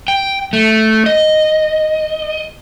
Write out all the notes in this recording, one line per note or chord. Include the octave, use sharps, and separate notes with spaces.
G5
A3
D#5